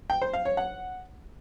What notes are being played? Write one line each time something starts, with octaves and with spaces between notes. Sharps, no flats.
G5
C5
F5
C#5
F#5